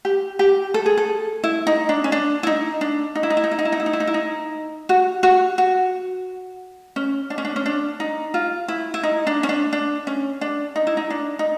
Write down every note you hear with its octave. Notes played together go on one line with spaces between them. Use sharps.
G4
G4
A4
G#4
A4
E4
D#4
D4
C#4
D4
E4
D#4
D4
D#4
E4
D#4
E4
D#4
E4
D#4
E4
D#4
E4
D#4
E4
D#4
E4
D#4
F#4
F#4
F#4
C#4
D4
C#4
D4
C#4
D4
D#4
F4
E4
E4
D#4
D4
C#4
D4
D4
C#4
D4
D#4
E4
D#4
D4
D#4